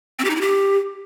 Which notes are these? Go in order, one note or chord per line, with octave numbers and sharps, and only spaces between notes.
C4
G4
D#4
E4
G4